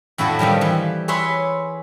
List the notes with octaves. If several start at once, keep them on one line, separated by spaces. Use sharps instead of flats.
F2 A2 E4 F#4 A4 A5
F2 D#3 F3 G3
E3
G#4 B4 C#5 E5 C6